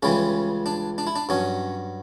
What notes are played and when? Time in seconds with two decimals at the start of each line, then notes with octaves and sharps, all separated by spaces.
0.03 C#2 C#3 E3 G3 C#4
0.66 D4
0.98 D4
1.07 E4
1.16 D4
1.29 G2 F#3 C#4